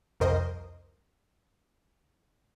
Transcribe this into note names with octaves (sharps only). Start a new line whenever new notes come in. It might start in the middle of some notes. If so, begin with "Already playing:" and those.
C2 F2 A#4 C5 D#5